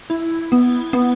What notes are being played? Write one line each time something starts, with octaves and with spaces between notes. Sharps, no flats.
E4
B3
B3